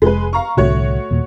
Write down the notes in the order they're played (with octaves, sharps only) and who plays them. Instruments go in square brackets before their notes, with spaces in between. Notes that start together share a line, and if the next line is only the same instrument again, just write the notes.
[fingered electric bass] F1 [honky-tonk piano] G#3 B4
[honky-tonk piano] F5 A#5 C#6
[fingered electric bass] C2 A2 D3 [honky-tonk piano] A3 F#4 C#5
[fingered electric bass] D#2 A#2